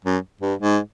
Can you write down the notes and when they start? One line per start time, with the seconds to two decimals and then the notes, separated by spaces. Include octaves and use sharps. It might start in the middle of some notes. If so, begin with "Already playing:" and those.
0.05 F#2
0.41 G2
0.59 G#2